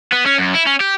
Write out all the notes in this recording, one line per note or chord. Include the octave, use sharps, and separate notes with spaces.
B3
C#4
F#2
E4
C#4
G4